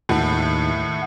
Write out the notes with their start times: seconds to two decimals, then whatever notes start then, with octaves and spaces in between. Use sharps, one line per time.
0.09 D#2 A2 A3 F#5